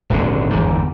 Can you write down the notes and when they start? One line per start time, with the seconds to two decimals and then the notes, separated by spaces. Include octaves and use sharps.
0.10 D#1 G#1 F#2 D3
0.50 G1 E2 G#2